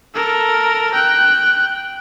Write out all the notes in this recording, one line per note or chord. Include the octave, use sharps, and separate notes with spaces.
A4 A#4
G5 F#6